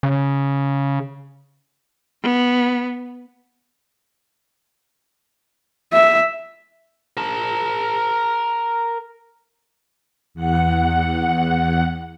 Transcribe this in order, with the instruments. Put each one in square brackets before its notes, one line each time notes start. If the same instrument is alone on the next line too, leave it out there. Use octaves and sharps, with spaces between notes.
[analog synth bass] C#3
[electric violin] B3
[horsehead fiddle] E5
[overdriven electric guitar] A#4 A5
[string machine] E2 F#5